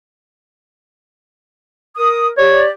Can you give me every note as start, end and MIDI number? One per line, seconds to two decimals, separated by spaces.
1.97 2.28 70
1.97 2.28 87
2.38 2.70 67
2.38 2.63 73
2.38 2.70 74